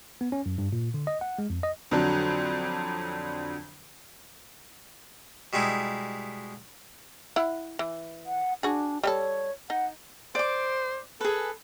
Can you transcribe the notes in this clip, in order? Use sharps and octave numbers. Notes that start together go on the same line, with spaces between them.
B3
C#4
F#2
G2
A#2
D3
D#5
F#5
G#3
F2
D#5
F2 D3 F#3 D4
B2 G3 G#3 D#4 E4
E4 F#5
E3
F#5
D4 F#4 G#4
G3 G4 A4 C#5
D#4 F#5
C5 D5 D6
G#4 A4 B4